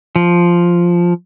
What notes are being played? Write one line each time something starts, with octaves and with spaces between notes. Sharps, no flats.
F3